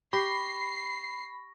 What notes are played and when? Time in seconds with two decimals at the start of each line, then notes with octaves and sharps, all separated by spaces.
0.13 G4 B5 C#6 A#6 C7